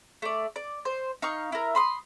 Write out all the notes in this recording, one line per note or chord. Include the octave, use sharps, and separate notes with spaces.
A3 D5
D5
C5
D#4 F5 C#6
E4 A#4
B5 C6 D#6